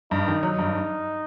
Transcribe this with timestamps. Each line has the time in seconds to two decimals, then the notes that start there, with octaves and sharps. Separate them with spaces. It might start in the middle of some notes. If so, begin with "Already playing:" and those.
0.11 G2 D#4
0.28 D#3
0.43 F#3
0.59 G2